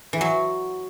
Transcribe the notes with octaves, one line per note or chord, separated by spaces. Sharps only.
E3
F#3